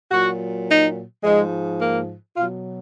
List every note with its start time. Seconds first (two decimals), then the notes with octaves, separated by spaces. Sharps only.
0.12 A#2 F#3 F#4
0.68 D#4
1.24 G#2 F3 G#3
1.80 A#3
2.37 B2 F#3 F4